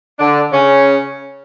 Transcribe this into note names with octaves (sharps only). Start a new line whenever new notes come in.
D3 D4
C#3 C#4